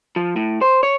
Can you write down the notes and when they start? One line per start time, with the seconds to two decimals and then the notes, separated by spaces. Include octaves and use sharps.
0.16 F3
0.36 A2
0.62 C5
0.83 C#5